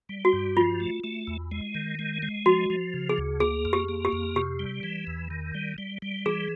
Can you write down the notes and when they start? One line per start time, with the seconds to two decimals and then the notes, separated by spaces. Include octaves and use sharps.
0.09 G3
0.25 F#4
0.33 G2
0.57 F3 F4
0.80 A3
1.04 A3
1.27 E2
1.51 G#3
1.75 D#3
1.99 G#3
2.22 G#3
2.46 F3 F#4
2.70 F3
2.94 C#3
3.09 G#4
3.18 D2
3.40 A#3 G#4
3.65 F2
3.73 G4
3.89 A#3
4.05 G4
4.12 F2
4.35 C3 G4
4.59 G3
4.83 E3
5.07 E2
5.30 D#3
5.55 G3
5.78 G3
6.02 G3
6.26 E3 G#4